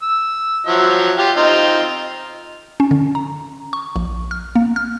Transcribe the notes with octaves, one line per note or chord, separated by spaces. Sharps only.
E6
F3 F#3 E5
F4 G4 F5
C4 D#4 F4
C#4
D3
A#5
C#6
A#1
F6
A#3
F6